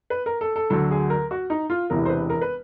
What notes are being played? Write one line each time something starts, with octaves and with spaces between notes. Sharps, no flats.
B4
A#4
A4
A4
D2 D3 F#3 A4
G#4
A#4
F#4
D#4
F4
E1 E2 C3 E3 A#4
C5
B4
A#4
B4